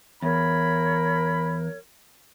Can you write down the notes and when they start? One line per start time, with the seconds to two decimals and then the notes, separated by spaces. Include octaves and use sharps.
0.22 E2 A#4 C#5 B5